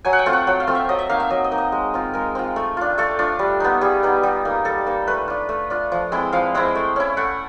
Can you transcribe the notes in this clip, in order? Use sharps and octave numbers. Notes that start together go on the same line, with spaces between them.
F#3 G#5
F#5
G5
A3 C4 F4
F#5
F#3 G5
F5
A3 C4 F4
E5
F#3 D#5
E5
A#3 D#4 F5
E5
F#3 D#5
D#5
A#3 D#4
D#5
G#3
C4 F4
G#3 A#4
C4 F4
A3
D4 F4
A3 A4
D4 F4
G3
B3 D#4
G3 G#4
B3 D#4
G3
A#3 D#4
G3 A4
A#3 D#4
A3 B4
D4 F4
A3
D4 F4
F3
G#3 C4 E4
F3 F5
G#3 C4 E4
A3
C#4 E4
A3 F#5